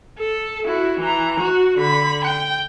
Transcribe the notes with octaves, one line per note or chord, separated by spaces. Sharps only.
A4
E4 F#4
E3 A#5
F#4
D3 B5
G5